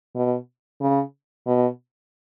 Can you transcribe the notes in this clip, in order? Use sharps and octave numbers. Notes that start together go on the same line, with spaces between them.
B2
C#3
B2